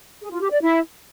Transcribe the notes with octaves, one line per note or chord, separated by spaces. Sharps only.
G#4
F4
G4
D5
E4